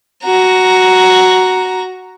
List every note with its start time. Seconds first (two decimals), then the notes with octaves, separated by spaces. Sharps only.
0.24 F#4 A#5